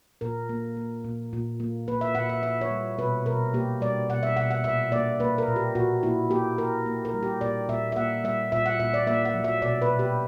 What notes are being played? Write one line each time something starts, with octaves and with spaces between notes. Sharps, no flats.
A#2 A#4
A#3
A#3
A#2
A#2
A#3
A#3 B4
E5
A#2 F#5
E5
A#3 E5
C#5
G3
B2 B4
B2 A#4
A#3 G4
G3 D5
B2 F#5
E5
B2 F#5
F#5
A#2 E5
A#3 D5
A#3 B4
A#4
A#2
G4
A#2 F#4
A#3 E4
A#3 G4
A#2 A#4
A#3
A#4
G3
G4
A#2 D5
A#2 E5
E5
A#3 F#5
G3 E5
A#2 E5
F#5
A#2 E5
D5
A#3 E5
F#5
F#3
E5
B2 D5
B4
B2
G4